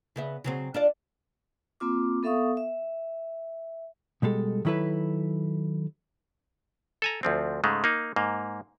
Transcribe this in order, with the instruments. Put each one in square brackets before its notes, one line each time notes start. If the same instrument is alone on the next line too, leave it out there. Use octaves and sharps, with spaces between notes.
[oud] C#3 B3 E5
C#3 F#3 C4
D4 F4 D5
[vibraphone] A#3 C4 F4 D6
B3 A4 E5 F5 C#6 D#6
E5
[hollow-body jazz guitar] B2 G3 G#3 A4
D#3 F#3 E4 A4 B4
[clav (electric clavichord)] A4 G#5 A#5
D2 F3 C4
G#2 C#3 G#3 A3
A#3 D#4
G#2 A#3